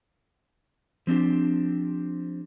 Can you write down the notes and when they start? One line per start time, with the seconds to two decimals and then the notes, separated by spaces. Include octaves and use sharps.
1.07 F3 C4 D4 G4